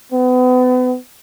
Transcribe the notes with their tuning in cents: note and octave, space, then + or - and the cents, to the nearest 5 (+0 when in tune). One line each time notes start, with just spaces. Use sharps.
B3 +35